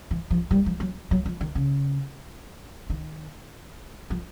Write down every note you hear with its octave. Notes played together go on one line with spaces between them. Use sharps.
E3
F3
G3
F3
F#3
F#3
F3
D#3
C#3
D#3
F3